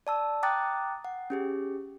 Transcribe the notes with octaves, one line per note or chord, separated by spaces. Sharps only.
D5 A5 E6
G5 A#5 D6 D#6 F#6 A6
F#5
C#4 G4 G#4